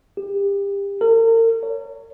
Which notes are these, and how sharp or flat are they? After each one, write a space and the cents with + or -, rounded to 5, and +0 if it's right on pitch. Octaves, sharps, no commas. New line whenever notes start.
G4 +30
A#4 -40
C#5 +15